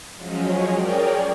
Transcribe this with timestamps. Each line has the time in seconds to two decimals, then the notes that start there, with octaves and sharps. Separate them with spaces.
0.17 F3 F#3 G#3 C#4
0.74 G#4 A#4 C#5 D5 G5